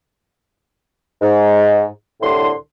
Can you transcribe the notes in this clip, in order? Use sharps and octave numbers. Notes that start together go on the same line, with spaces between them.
G#2
C2 A2 D3 C6